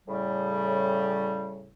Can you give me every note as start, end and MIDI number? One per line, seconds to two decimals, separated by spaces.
0.08 1.70 45
0.08 1.70 49
0.08 1.70 55